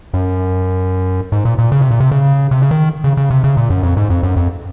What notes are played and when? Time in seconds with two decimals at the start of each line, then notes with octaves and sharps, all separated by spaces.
0.14 F#2
1.32 G#2
1.45 A#2
1.59 A#2
1.72 C#3
1.81 C3
1.90 A#2
2.00 C3
2.12 C#3
2.51 C3
2.62 C#3
2.71 D#3
3.04 C#3
3.17 C#3
3.31 C3
3.44 C#3
3.57 A#2
3.70 F#2
3.83 F2
3.97 G#2
4.10 F2
4.23 F#2
4.36 F2